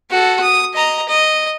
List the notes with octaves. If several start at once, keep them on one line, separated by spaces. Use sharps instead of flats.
F#4 A4
D#6
D#5 A#5
D#5